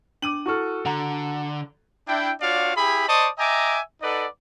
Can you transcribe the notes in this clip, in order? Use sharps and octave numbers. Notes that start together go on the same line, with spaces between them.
D4 D6 D#7 F#7
E4 F#4 A4 C#6 F6
D3 F#5 A#5
D4 E4 G5
D4 F4 F#4 C#5 D5 F5
E4 G4 G#4 B5
C5 D5 D#5 A5 C#6 D#6
D#5 E5 G5 G#5 A#5 D6
D#4 A4 B4 D5 D#5 F#5